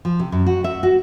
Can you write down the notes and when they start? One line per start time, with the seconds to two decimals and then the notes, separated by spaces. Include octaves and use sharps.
0.05 F3
0.20 C3
0.32 F#2
0.46 F#4
0.64 E5
0.83 F#4